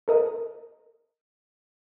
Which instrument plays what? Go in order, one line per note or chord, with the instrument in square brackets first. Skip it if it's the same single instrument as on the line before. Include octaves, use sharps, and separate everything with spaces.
[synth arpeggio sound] A4 A#4 D#5